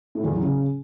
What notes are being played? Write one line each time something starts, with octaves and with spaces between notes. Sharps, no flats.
A2
E2
F#3
C#3